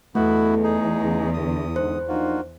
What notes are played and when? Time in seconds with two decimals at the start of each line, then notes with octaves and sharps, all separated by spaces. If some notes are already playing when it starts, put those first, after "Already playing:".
0.15 E2 G2 E3 A3 B3 E4 F#4 A4
0.64 D#4 G#4
1.02 C#3
1.34 D3 D#6
1.76 G#2 D3 C5
2.08 F3 A#3 D4 D#4 F4 F#4